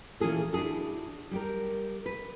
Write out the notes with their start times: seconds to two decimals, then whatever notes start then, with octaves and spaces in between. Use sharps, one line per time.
0.20 A#2 E3 C#4 F4 G#4 A4
0.53 D4 E4 F#4 G#4 A4
1.31 G3 G4 A#4
2.06 B4